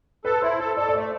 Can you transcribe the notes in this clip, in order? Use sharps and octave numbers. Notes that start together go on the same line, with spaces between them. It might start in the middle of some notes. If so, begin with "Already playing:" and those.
A4 B4
E4 C5
A4 C5
A4 D5
D5
A3 C5